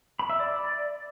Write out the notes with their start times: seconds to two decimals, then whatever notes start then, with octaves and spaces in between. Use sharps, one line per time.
0.19 B5
0.30 E5
0.40 D5